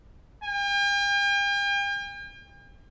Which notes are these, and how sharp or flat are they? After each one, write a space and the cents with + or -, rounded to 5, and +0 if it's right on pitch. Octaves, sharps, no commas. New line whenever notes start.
G5 +45